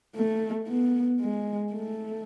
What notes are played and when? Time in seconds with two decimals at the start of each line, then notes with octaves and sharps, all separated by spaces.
0.16 A3
0.68 B3
1.21 G#3
1.73 A3